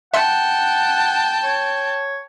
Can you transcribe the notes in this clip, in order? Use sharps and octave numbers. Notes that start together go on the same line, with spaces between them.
E5 F#5 G5 A5 C6 C#7
C#5